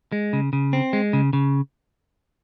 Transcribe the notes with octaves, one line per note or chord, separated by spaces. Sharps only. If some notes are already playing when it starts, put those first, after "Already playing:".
G#3
C#3
C#3
C4
G#3
C#3
C#3